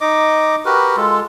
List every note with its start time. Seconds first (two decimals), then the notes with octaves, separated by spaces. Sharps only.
0.01 D#4 D#5 D6
0.65 F#4 G4 A#4 B4
0.97 G#3 F4 A4